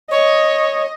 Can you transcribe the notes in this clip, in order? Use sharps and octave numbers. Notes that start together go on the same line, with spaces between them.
C#5 D#5